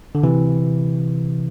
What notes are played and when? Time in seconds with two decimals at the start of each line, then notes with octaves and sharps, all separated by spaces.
0.15 D3
0.23 C3 E3